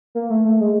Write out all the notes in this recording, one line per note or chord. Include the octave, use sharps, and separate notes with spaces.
A#3
A3
A3
G#3